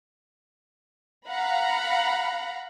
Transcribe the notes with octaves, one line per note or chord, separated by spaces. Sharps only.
F5 F#5 A#5 B5